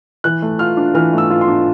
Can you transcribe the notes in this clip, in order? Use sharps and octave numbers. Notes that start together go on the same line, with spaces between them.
E3 F#6
A3
F4 F6
D4
E3 F6
A3
E6
F4
C6
D4